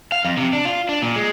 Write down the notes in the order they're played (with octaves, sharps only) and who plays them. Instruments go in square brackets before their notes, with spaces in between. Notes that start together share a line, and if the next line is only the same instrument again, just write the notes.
[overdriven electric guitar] F5
F2
C3
D4
F4
D4
A#2
G#3